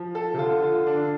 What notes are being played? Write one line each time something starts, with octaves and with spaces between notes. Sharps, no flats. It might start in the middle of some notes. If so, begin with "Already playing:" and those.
Already playing: F3
A4
C3
D3 F4
F4
D4